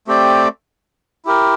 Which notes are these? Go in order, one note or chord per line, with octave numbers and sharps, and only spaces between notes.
A3 C4 G4 D5
E4 G4 A#4